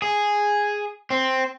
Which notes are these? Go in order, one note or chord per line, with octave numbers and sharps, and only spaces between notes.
G#4
C4